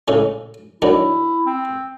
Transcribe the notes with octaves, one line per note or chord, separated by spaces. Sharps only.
A2 C#3 G#3
D#3 F#3 D4 E4
C4